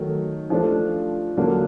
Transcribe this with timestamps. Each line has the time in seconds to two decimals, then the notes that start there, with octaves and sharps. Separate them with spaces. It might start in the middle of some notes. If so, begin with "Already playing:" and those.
Already playing: D#3 F#3 A3
0.50 F3 A3 D4
1.37 D3 F#3 A#3 D4